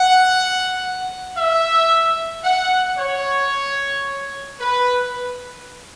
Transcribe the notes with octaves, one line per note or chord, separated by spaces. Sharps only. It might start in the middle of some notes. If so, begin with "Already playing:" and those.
Already playing: F#5
E5
F#5
C#5
B4